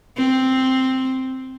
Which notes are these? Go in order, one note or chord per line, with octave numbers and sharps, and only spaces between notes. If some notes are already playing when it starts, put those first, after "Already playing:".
C4